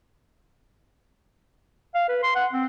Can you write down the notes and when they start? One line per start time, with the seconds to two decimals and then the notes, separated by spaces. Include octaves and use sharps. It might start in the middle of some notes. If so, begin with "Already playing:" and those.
1.95 F5
2.09 B4
2.23 C6
2.35 F#5
2.53 C4